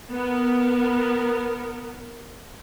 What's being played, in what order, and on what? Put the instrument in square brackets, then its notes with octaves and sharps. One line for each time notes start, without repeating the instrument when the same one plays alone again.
[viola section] B3 A#4